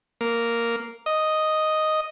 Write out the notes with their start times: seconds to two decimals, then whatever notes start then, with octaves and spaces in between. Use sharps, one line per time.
0.21 A#3
1.06 D#5